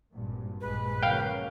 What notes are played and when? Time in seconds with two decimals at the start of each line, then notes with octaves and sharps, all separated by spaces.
0.14 G#1 G2 A#2
0.61 A#1 G2 G#3 B4
1.03 C#3 F#3 A#3 F5 G5